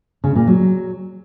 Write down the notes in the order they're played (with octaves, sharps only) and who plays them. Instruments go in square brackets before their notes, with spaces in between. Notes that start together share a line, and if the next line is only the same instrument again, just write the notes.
[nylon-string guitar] C#3
A#2
F#3